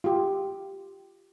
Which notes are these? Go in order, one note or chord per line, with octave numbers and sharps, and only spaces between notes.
F4 G4